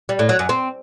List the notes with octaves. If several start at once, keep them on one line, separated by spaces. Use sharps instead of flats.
G3
A2
F#3
F#2
C4